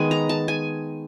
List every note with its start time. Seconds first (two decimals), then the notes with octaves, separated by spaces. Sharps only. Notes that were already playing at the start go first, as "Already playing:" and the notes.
Already playing: D#3 G#3 B3 G#5
0.11 A#5
0.29 A5
0.48 G#5